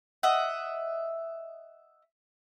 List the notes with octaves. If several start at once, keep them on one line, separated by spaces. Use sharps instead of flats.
D#5 E5 F#5